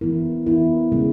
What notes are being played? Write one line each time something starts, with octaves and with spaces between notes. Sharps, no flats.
E3 B3 E4 A#4
E3 B3 E4 A#4
C#3 G#3 B3